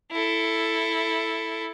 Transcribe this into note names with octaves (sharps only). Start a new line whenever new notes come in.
E4 A4